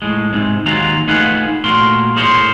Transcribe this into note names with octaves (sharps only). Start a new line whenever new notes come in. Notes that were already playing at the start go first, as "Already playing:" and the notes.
A2 G#3
G#2 C3 G#3
D#2 D#3 F#3 G#3 F4 A#5
A3 D#4 F4 G#4 B4 F#5
A#2 A3 F#4 A#4 C6
A2 G#4 A#4 C5 C#5 C6